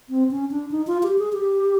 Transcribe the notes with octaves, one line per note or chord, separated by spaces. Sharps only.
C4
C#4
D4
D#4
F4
G4
G#4
G4